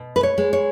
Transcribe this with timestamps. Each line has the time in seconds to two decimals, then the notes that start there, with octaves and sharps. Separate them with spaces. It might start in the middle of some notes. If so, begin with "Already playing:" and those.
Already playing: B2
0.16 B4
0.23 C#5
0.38 G#3
0.53 C#5